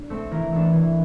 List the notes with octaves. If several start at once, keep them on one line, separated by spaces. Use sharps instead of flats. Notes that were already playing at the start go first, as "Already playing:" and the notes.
Already playing: D4
A3 C4
E3 A#4
A3 D4
E3